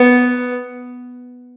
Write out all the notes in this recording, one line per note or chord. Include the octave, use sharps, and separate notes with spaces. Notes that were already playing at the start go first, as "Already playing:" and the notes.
Already playing: B3